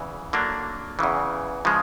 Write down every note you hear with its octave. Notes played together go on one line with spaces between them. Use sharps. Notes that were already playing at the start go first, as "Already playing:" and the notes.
Already playing: E2 C#3 E3
D3 F#3 A#3 D4
E2 C#3 E3
C#3 F3 G#3